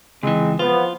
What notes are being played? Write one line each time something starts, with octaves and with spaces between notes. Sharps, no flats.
C#2 E3 G#3 C4
F3 B3 F4 B4